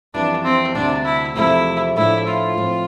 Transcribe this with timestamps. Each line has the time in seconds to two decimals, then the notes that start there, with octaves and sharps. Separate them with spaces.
0.13 F2 E3 G3 D4
0.44 C4
0.75 D2 C3 G3 D4
1.05 E4
1.35 E2 C3 F3 A3 E4
1.96 A2 F3 A3 D4 E4
2.27 F4
2.57 A2 F3 C4